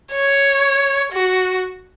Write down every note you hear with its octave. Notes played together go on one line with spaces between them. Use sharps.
C#5
F#4